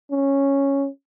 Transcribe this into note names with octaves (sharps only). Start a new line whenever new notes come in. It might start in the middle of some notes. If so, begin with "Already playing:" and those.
C#4